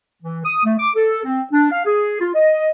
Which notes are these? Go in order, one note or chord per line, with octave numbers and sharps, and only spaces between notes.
E3
D#6
A3
D6
A4
C4
D4
F5
G#4
F4
D#5